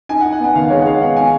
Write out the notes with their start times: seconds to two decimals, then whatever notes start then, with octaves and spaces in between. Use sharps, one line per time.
0.09 D#4 G#5
0.21 F#5
0.25 D#4
0.32 F#5
0.40 B3 G#5
0.55 D#3 F5
0.70 G#3 C#5
0.81 F#5
0.86 B3 F5
1.01 D#4 F#5
1.17 B3 G#5